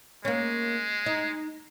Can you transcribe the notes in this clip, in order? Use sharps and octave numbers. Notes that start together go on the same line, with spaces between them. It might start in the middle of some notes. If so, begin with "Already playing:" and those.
G#3 A#3 C#4
D#4